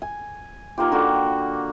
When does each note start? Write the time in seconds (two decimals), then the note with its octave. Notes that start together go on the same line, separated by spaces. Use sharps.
0.02 G#5
0.78 D#3 A#3 F4 G4
0.92 D3 F#4 G5